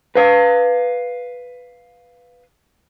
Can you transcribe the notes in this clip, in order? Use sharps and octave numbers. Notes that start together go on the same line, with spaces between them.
B4 F5